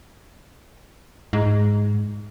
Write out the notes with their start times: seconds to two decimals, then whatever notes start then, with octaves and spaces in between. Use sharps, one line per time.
1.33 G#2